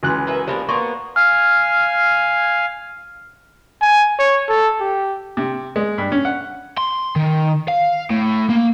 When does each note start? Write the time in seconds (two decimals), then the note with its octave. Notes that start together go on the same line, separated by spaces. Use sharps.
0.03 C#2 E3 F#4 C6 F#6
0.27 A#3 B4 E5
0.47 F3 A#3 D4 G4 C5 B5
0.69 A#3 B3 D4 C6 C#6
1.16 F5 G#5 F6
3.81 G#5
4.19 C#5
4.49 A4
4.80 G4
5.37 C3
5.76 G#3
5.98 G2
6.12 C#4
6.25 F#5
6.78 C6
7.16 D#3
7.68 F5
8.11 A2
8.49 A#3